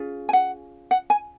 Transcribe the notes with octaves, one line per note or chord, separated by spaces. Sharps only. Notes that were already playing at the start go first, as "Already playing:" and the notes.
Already playing: C#4 F4 G#4
G#5
F#5
F#5
G#5